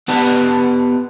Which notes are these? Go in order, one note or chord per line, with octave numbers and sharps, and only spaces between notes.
B3 G4 B4 F#5 A5